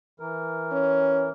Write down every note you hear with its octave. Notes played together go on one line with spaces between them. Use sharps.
E3 A#4
C#4